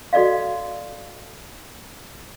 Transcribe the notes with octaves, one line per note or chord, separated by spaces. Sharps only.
F#4 A4 D5 D#5 F5